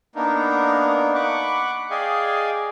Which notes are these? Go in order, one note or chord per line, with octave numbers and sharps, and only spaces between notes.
A#3 B3 D4 D#4 A#4
F#5 B5 C#6 D6 F#6
G#4 D5 D#5 F5 G5 G#5